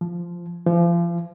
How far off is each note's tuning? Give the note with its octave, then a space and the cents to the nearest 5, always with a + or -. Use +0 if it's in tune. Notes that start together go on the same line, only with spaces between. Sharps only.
F3 -10
F3 -35